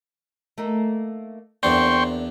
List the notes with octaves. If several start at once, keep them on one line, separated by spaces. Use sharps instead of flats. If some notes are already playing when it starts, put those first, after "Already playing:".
A3 A#3 D#4
E2 A#3 C4 D4 G5 C6 C#6